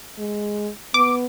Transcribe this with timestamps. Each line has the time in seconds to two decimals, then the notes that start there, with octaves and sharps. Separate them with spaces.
0.18 G#3
0.94 B3 D6